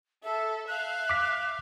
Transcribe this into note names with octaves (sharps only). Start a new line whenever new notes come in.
A4 E5
E5 F5 F#6
D6 B6